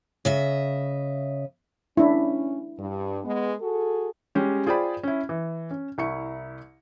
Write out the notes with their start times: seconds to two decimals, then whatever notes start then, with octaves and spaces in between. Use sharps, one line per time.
0.25 C#3 D#5 E5
1.97 C#4 D4 E4
2.79 G2
3.25 G#3 B3
3.61 F#4 G#4 A4
4.35 G3 G#3 C#4 G4
4.66 F4 G#4 C5 D5 G5 B5
5.03 C#4 E4
5.29 E3
5.71 C#4
5.98 C2 E4 C#6 C#7